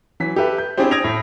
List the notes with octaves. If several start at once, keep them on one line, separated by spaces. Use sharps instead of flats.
E3 F#3 B6
G4 A4 B4 E5
G6
C4 D4 E4 G4 G#4 C5
D#6 G#6 A#6 D7 F7
A2